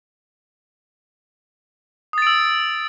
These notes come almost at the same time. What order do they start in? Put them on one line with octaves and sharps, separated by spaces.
D#6 A6 D7 E6